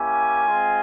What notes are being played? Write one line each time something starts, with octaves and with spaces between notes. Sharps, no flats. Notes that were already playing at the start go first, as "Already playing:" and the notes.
Already playing: A#3 C#4 E4 G4 G#5
G#3 C4 F4